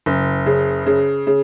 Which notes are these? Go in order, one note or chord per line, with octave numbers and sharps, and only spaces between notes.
F#1
C#3
C#3
C#3